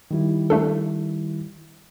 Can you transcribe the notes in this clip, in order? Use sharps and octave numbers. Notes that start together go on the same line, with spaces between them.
D#3 G3 E4
A3 D4 A4